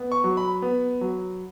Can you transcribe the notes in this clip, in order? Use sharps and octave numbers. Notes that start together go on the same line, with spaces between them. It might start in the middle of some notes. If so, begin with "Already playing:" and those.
Already playing: B3
C#6
F#3
B5
B3
F#3